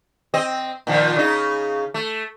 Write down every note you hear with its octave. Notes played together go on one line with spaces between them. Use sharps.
C4 D#5
A#2 D#3 F3
C#3 D#4
A3